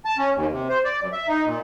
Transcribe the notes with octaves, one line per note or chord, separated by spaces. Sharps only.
A5
C#4
D#2
C3
C5
D5
F#2
E5
D#4
A#2